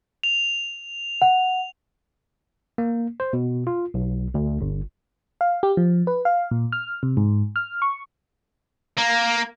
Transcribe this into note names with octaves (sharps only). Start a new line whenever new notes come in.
F7
F#5
A#3
C5
B2
F4
B1
D2
G1
F5
G4
F3
B4
F5
A#2
F6
C3
G#2
F6
C#6
A#3